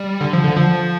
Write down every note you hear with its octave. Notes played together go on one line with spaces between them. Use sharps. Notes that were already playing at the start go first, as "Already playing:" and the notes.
Already playing: G3
D3
F3
D3
F3